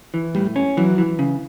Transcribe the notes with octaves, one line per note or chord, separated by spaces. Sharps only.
E3
A2 G3
C#4
E3 F#3
E3
C#3